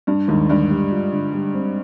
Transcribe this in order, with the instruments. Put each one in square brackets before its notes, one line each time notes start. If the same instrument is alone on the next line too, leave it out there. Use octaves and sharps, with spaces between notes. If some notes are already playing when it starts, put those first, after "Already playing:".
[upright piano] G2 [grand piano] D4
[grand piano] D#2 [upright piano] G#2
[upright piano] G2 [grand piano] D3
[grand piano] G3
F4
D3
G3
C4